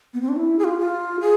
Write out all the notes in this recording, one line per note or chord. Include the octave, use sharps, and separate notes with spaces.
B3
C4
D4
E4
G#4
F4
F4
G#4